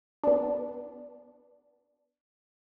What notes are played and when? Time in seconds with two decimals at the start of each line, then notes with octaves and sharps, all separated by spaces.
0.24 B3 D4